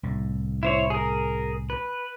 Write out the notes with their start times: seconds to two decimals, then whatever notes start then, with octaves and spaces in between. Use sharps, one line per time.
0.03 C2 A2
0.63 E4 C5 C#5
0.90 G#4 A#4
1.70 B4